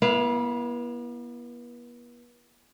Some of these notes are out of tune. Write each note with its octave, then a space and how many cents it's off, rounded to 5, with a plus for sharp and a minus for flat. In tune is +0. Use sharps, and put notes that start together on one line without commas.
B3 -40 E4 +20 F5 +0